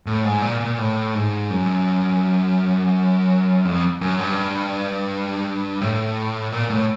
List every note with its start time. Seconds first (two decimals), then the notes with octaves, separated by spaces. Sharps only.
0.07 A2
0.24 G#2
0.42 A#2
0.60 A#2
0.78 A2
1.15 G#2
1.50 F#2
3.65 F2
4.01 F#2
4.19 G2
5.81 A2
6.52 A#2
6.70 A2